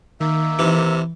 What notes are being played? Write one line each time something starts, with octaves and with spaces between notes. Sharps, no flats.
D#3 A#3 E5
C3 E3